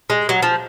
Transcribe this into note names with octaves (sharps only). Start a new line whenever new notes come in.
G#3
F#3
F3